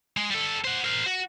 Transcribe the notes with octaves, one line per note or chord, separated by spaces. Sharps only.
G#3
G3 A4
C5 F#5
A#4 C5
F#4